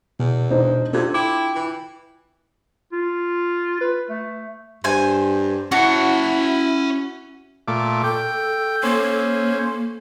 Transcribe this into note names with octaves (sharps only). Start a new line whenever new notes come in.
E2 B2
E1 D4 D#4 C5
C3 D4 F4 A4 G#6
E4 G5 D6
E3
F4
B4
A3
G2 C5 G#5
C#4 E4 F#4 A5
A#2 A3 D6
A4 G5
A#3 C#4 C5